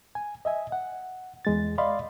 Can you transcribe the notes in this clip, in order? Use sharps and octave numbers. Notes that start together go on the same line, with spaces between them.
G#5
D#5 E5 G#5
F#5
E2 G#3 A6
D5 D#5 F5 B5 C6